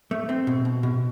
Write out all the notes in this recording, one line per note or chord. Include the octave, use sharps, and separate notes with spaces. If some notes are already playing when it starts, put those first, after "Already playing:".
A3
C4
B2
B2
B2